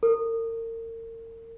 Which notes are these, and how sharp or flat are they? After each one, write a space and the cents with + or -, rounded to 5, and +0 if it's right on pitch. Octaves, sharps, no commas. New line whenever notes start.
A#4 -40